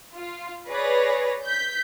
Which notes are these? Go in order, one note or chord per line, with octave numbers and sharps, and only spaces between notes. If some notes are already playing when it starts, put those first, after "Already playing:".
F4
G#4 B4 C#5 D5 A#6
G6 B6